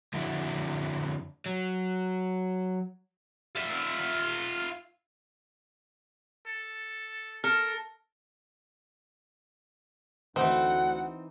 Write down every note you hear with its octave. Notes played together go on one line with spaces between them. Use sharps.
F2 D3 E4 F#4
F#3
F4 E5
A4
A4 A#4 F6
D2 E3 C4 D#4 F#5